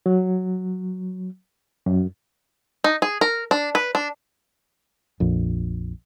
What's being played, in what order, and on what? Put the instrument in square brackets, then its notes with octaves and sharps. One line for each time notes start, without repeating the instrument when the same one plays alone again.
[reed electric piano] F#3
F#2
[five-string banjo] D#4
G#4
A#4
D4
B4
D4
[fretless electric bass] A#1 F2